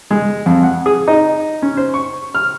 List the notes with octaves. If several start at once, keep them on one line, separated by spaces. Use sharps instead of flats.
G#3
F2
F#5
G#4
D#4
C#4
C5
C#6
F6